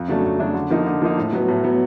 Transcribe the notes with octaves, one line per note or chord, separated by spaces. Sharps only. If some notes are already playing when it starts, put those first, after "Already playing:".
Already playing: F2
C#3 F#3 A3 D4
F2
C#3 F#3 A3 D4
D3
F3 A#3 D#4
D3
F3 A#3 D#4
A2
F#3 B3
A2
F#3 B3